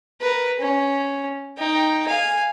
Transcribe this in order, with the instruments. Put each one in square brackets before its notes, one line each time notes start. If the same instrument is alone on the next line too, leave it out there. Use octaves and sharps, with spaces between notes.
[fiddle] A#4 B4
C#4
D#4 G5
F5 G#5